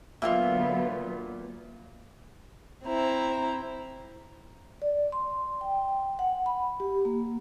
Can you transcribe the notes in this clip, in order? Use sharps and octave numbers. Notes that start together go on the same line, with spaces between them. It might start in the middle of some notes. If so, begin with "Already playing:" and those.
A#2 D3 F#3 B3 F4 F#4 E5
C4 E4 A#5
D5
C6
G5
F#5
B5
G4
A#3